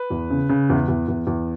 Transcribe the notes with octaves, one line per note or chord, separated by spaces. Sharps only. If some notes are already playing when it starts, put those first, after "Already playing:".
Already playing: B4
E2
C#3
C#3
E2
E2
E2
E2